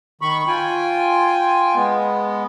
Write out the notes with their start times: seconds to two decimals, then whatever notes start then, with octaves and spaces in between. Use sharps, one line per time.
0.22 D#3 B5 C#6
0.48 F4 G5 G#5
1.75 G#3 B3